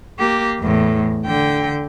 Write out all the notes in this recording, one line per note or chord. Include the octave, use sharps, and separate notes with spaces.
A#3 G4
E2 A2
D3 G5